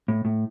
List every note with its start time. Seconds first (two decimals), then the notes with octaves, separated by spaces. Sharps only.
0.08 A2
0.25 A2